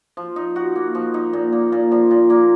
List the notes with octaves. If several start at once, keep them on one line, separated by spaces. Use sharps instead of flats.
F3
D#4
F#4
A#3
F3
D#4
A#2
A#3
A#2
F3
A#2
A#3